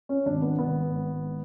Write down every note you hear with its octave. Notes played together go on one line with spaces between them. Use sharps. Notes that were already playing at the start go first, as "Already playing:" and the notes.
C#4
G#1 D4
B3
G#1 B3
G#2